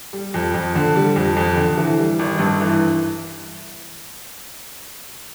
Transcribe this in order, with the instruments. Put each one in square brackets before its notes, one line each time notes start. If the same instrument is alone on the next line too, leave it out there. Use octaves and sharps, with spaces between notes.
[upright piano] G3
F2
F2
D3
G3
F2
F2
D3
E3
G3
G#1
G2
E3